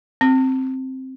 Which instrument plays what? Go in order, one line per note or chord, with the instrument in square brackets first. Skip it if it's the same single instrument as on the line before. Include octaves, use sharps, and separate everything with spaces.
[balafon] C4